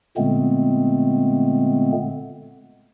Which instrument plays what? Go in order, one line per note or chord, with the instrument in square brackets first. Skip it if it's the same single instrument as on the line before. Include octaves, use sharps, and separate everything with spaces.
[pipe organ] A#2 D3 G#3 A3 B3 C4